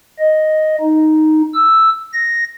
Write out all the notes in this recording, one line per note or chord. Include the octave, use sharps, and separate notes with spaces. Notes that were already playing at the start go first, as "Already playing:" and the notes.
D#5
D#4
E6
A#6